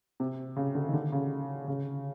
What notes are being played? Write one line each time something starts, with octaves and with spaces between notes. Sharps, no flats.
C3
C#3
D3
D#3
D3
C#3
C#3